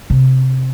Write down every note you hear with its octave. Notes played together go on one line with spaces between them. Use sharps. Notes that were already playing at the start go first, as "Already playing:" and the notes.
C3